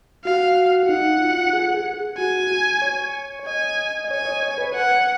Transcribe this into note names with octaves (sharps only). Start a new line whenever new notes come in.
F#4 F5
D#4 F#5
F4
G#4
G#4
F#4 G#5
C#5
D#5 G#5
C#5 G#5
D#5
C#5
B4
F#5